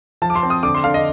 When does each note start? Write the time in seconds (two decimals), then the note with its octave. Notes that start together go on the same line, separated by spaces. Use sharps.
0.22 F3 A5
0.30 D6
0.35 C6
0.43 C4
0.50 D#6
0.63 D3 D6
0.75 C6
0.84 D3 F5
0.94 D#5